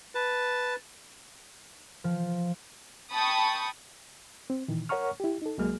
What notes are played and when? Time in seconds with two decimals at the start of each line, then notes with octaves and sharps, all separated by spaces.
0.15 B4 A5
2.04 F3
3.12 G5 A5 B5 C#6 D#6
4.50 C4
4.68 A#2 D#3 E3
4.89 A#4 C#5 F#5 A#5 C#6 F6
5.20 E4 G4
5.42 D#4 A4
5.58 C2 F#3 G#3 A#3 G#4 F6